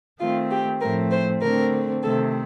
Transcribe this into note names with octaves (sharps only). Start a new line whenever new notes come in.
D#3 A3 C4 F4
G4
A2 F3 A3 C4 A#4
C5
D3 A3 C4 A#4
C3 D#3 A3 C4 A4